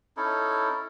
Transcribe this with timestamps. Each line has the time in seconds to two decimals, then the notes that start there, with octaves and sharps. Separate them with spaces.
0.17 C#4 D#4 E4 A4